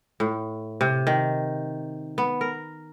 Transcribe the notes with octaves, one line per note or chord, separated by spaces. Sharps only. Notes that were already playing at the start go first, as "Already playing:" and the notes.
A2
C3
D#3
B3
A#4